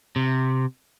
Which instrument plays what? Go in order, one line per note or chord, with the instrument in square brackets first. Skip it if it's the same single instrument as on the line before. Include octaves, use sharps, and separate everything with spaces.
[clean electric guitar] C3